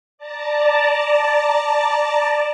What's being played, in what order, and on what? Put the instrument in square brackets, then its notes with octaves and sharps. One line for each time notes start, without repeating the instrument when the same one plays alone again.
[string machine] D5 A5 A#5